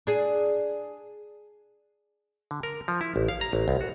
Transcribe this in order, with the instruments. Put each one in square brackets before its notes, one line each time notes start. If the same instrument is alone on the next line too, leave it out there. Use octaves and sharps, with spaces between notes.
[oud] D4 G#4
[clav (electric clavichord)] D3
A#4
F3
E4
A1
F5
A#5
A1
C2
F#4